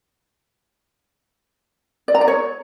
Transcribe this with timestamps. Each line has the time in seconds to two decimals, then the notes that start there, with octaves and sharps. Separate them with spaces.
2.08 D5
2.15 A#5
2.21 D5
2.28 C#5